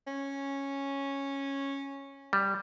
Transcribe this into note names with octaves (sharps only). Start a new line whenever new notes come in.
C#4
G3